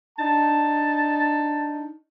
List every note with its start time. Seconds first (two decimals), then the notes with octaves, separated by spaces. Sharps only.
0.19 D4 D#4 A5